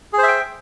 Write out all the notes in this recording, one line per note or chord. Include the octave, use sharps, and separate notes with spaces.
G#4 C5 E5 G5